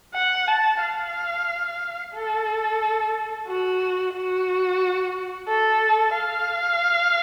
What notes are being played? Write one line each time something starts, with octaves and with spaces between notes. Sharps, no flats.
F#5
A5
F5
A4
F#4
F#4
A4
F5